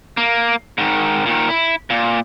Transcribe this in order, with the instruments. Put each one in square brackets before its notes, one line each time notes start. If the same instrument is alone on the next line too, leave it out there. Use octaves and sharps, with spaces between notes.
[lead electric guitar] A#3
G#2 D#3
A#2 D#3
E4
A#2